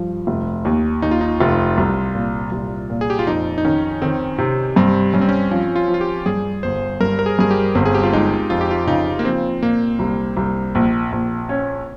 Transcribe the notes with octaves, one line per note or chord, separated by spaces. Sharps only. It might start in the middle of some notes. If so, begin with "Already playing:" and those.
Already playing: G2 F3
F1
D#2
D#2 D#4
F4
D#4
F1 F4
C2
A#2
C2
A#2
G#4
G4
F4
F2 D#4
D#4
D#3 C#4
D#3 C4
C3
G2 C4
G2 C#4
C4
C#4
F3 C#4
F4
F3
F4
G4
G2 G#4
G1 C5
G2 A#4
A#4
G#4
G2 G#4
G4
G1 C4
G#4
G4
F4
G#3 D#4
F2 F4
G4
F4
C#3 D#4
A#3
F3 C4
A#2 A#3
C2
C2
A#1
A#1
C#4